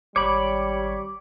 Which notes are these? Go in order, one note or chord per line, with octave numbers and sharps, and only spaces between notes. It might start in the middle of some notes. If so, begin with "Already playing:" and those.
G#1 G3 C#5 B5 D6